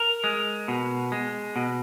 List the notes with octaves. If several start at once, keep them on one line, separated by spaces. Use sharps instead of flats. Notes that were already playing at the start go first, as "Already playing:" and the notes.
Already playing: A#4
G#3
B2
G#3
B2